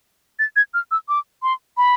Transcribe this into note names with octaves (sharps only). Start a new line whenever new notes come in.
A6
G#6
F6
E6
D6
C6
B5